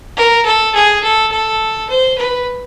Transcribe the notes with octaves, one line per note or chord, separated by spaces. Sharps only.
A#4
A4
G#4
A4
A4
C5
B4